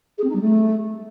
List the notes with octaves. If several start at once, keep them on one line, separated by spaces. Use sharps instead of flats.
G#4
C4
D#4
G3
A3